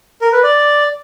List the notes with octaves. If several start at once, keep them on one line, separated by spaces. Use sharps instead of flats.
A#4
B4
D5